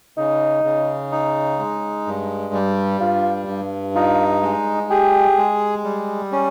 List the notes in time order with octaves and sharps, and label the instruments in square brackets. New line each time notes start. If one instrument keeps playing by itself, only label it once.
[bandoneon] C#3 [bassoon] D#4
[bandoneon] C#3
D#4
G#3
G2
G3
[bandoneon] G2 [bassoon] F4
[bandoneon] G2
[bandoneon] D#4 [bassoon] F4
[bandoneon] G#3
[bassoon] G4 [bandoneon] G#4
[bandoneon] G#3
G3
C#4